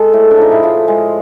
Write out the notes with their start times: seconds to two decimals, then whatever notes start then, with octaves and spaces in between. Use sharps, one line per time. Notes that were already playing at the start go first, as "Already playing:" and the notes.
Already playing: G#3 A4
0.13 A2
0.31 D4
0.37 F3 D#4
0.52 E4
0.63 A2 F4
0.88 G#3